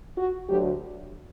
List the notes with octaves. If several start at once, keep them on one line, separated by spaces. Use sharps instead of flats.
F#4
D2 D3 F#3 G4